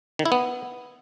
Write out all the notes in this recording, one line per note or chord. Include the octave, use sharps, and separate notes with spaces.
D#3
E4
B3